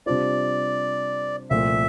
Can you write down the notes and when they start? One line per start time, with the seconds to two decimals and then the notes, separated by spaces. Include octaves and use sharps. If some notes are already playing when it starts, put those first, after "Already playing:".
0.06 C3 G3 D4 F4 C5 D5
1.50 C2 A#2 F3 A3 E5